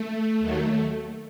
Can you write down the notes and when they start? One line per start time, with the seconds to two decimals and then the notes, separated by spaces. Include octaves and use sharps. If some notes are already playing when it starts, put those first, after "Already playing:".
Already playing: A3
0.40 D#2 D#3 F#3